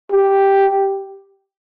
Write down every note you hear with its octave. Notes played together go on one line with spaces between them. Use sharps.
G4